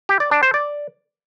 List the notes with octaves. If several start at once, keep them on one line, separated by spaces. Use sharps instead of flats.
G4
D5
D4
C5
D5